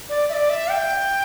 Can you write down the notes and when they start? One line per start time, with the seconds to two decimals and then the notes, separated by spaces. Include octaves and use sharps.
0.09 D5
0.29 E5
0.33 D5
0.49 E5
0.70 G5